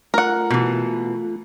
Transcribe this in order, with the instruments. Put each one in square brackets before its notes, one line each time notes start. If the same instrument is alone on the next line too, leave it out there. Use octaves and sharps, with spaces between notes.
[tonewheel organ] A3 F4 [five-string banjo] A#4 F#5
[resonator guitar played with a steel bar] B2 E3